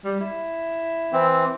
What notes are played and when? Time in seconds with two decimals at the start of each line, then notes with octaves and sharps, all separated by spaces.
0.05 G3
0.21 E4
1.13 E3 C4